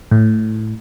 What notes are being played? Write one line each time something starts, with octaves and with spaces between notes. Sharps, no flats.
A2